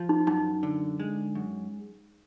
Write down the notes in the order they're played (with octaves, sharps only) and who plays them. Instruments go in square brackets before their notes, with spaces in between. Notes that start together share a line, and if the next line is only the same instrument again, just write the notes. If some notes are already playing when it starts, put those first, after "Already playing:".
Already playing: [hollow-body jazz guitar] F3
[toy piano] D#4
[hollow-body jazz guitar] F#2 [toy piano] D#4
[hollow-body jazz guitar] D3
G#3
F#2